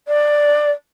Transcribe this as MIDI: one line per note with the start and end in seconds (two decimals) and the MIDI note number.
0.08 0.71 74